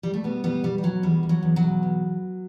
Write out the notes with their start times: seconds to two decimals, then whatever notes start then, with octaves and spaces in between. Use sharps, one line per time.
0.03 G3
0.14 A3
0.23 B2 G3 B3
0.43 B2 G3 B3
0.63 B2 G3
0.78 G3
0.83 B2 F#3
1.03 E2 G3
1.23 E2
1.29 F#3
1.43 E2
1.56 F#3
1.63 B2
1.83 E2